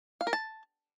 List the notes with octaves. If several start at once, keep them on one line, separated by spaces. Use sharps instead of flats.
F5
A#4
A5